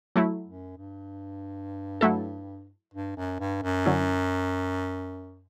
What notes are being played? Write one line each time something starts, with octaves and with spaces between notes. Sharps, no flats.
F#3 A3 E4
F#2
G2
F#3 A3 E4 A4
G2
F#2
G2
F#2
D3 F#3 C#4 E4